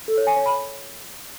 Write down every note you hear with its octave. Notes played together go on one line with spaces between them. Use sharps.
A4
C#5
G#5
C#5
B5